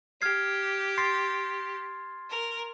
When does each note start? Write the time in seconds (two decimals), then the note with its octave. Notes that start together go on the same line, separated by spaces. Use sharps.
0.22 G4 F6 G#6 C7
0.98 C6 A6 C7
2.30 A#4